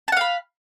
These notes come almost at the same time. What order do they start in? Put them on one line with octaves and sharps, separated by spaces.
A5 F#5 F5 B5